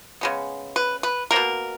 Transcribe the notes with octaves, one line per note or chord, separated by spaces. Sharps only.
C#3 G#3 B3
B4
B4
F#3 A#3 A#4
B2